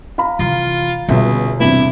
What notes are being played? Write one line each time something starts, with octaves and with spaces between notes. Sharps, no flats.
F5 A#5 B5
C3 E3 F4
G1 C#2 B2 B3 E5
E2 G2 C3 E4